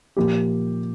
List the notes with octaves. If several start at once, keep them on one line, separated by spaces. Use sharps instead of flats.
A#2 F3 A#3 G4